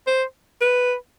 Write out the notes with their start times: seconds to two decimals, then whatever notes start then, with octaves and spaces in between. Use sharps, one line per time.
0.07 C5
0.61 B4